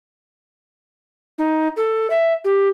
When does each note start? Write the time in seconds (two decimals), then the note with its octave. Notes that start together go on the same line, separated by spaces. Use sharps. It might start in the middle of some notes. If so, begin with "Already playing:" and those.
1.38 D#4
1.77 A4
2.10 E5
2.44 G4